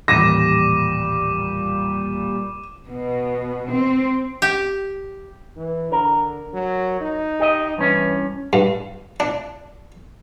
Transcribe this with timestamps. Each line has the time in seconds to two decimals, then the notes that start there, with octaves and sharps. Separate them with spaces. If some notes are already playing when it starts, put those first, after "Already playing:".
0.08 A1 D#2 A#2 G3 D6 A#6 D#7 E7
2.88 B2
3.69 C4
4.42 G4
5.57 E3
5.92 D3 A#4
6.54 F#3
7.01 D#4
7.40 G4 D#5
7.78 G2 E3 C#4
8.53 G2
9.20 D4